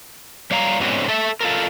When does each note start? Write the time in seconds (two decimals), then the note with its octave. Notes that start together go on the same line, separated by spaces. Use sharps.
0.51 G3 C#5 F5 A5 A#5
0.80 G#2 B2 D3 F#3 C4 C#4
1.09 A4 E5
1.40 F4 A4 A#4